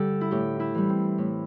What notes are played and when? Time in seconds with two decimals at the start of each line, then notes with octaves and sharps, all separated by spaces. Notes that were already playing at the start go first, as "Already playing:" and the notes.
Already playing: G2 D3 G3 G4 A4
0.21 E4
0.31 A2 G4
0.60 E4
0.75 E3 G3
0.89 C4
1.18 A2